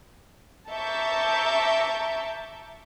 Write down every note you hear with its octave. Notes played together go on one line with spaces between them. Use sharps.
E5 A5 A#5 C#6 D6 G6